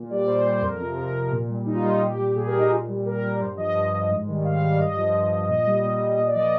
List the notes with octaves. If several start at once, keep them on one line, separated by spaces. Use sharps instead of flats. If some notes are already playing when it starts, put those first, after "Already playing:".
Already playing: A#2
G3 D5
A#2 C5
G3
C5
F2 A#4
C3 F3
F2 A#4
C3
F3
A#2
G3
A#2 D#4
F4
D#4
G3
F4
A#2 G4
G3
A#2 G#4
A#4
G3 D#4
A#2 F4
G3
A#2 A#4
G3
D5
G2 C5
F3 D#5
G2
F3
G#2
D#3 G3
G#2 F5
D#3 G3 F5
D5
G2 D#5
F3
G2
F3
A#2 D#5
G3
A#2
G3
A#2 D#5
D5
F3 D#5
D5